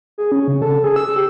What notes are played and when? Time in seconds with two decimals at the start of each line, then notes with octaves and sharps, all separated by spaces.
0.18 G#4
0.32 C#4
0.48 C#3
0.62 A4
0.84 G#4
0.96 E6
1.16 G4